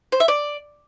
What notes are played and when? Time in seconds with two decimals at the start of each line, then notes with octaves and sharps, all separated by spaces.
0.12 C5
0.20 E5
0.28 D5